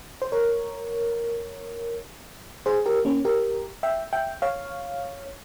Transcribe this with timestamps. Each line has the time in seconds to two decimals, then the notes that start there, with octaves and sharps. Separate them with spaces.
0.22 C5
0.32 A#4 C#5
2.66 G#4 C5
2.86 G4 A#4
3.05 A#3 C#4
3.25 G4 A#4
3.83 E5 G5
4.13 E5 G5
4.42 C#5 F5